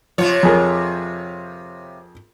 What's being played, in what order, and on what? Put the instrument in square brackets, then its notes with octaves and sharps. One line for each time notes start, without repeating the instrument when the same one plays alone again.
[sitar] C3 F4 C#5 [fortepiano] F3
[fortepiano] F2 G#4 A#4